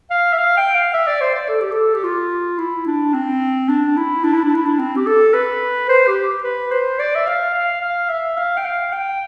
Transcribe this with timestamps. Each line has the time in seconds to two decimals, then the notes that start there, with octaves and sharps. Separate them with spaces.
0.10 F5
0.33 E5
0.38 F5
0.57 G5
0.75 F5
0.94 E5
1.07 D5
1.21 C5
1.35 D5
1.49 A4
1.60 G4
1.71 A4
1.94 G4
2.04 F4
2.58 E4
2.87 D4
3.14 C4
3.69 D4
3.97 E4
4.23 D4
4.34 E4
4.44 D4
4.55 E4
4.65 D4
4.79 C4
4.97 G4
5.06 A4
5.34 B4
5.89 C5
6.07 G4
6.44 B4
6.71 C5
6.99 D5
7.15 E5
7.27 F5
7.54 F5
7.81 F5
8.09 E5
8.37 F5
8.57 G5
8.65 F5
8.92 G5